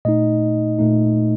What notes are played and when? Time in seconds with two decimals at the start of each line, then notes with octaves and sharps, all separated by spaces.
0.05 A#2 A3 D#4 D#5
0.79 A#2 A3 D#4